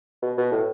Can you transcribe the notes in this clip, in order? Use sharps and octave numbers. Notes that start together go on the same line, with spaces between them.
B2
B2
A2